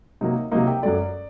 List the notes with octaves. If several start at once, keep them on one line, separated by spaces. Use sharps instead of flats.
C3 F#3 A#3 D#4
C3 F#3 A#3 D#4
G4
F#2 F#3 A3 D5